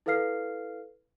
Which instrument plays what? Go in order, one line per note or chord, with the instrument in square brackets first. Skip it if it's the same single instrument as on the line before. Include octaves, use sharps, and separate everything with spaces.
[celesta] E4 A4 B4 F5 F6 C7